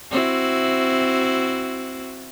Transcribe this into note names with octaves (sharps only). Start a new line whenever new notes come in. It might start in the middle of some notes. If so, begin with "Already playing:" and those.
C4 E4 F#4